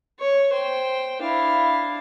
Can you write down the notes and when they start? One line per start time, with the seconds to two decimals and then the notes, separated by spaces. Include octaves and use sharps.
0.19 C#5
0.52 C5 G5
1.22 D4 E4 F5